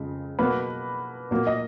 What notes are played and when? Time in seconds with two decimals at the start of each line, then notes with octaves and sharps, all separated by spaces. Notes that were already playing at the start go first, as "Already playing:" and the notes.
Already playing: F2 C#3 G#3
0.39 B2 F#3 A#3 B4
1.31 A#2 F#3 A#3
1.47 D#5